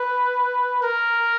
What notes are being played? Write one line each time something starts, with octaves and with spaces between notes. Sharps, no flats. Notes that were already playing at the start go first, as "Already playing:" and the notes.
Already playing: B4
A#4